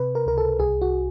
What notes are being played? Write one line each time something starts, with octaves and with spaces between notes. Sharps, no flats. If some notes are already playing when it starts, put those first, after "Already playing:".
Already playing: C3 B4
A#4
C#2 A#4
A4
C2 G#4
F#4